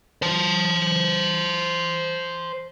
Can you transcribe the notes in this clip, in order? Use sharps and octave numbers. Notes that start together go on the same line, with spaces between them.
C5 A5